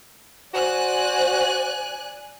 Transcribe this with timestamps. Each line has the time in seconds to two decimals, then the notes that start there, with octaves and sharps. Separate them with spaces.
0.54 F#4 C5 D5 G#5 F#6